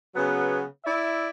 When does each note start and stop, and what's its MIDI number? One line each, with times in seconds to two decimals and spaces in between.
0.15 0.62 49
0.15 0.62 54
0.15 0.62 59
0.84 1.29 64
0.84 1.29 74
0.84 1.29 76